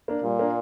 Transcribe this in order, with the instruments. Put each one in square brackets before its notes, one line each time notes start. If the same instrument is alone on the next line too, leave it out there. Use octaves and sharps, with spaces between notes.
[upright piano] A#3 D4
[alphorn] A#2 [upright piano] G3
[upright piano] A#3 D4